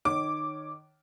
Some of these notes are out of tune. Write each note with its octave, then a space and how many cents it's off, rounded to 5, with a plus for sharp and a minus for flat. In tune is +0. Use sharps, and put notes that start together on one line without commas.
D#3 -25 C#5 -5 D6 -5